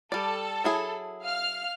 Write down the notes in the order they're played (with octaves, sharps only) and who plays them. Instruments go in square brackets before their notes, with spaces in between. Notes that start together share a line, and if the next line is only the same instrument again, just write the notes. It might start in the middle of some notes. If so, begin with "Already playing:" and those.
[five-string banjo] G3 D5 [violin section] A4
[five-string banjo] F#3 E4 G#4
[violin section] F5 F6